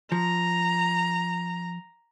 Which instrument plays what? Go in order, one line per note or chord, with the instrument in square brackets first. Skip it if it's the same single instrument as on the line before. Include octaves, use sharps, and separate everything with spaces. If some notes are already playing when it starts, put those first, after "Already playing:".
[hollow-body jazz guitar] F3 [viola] A#5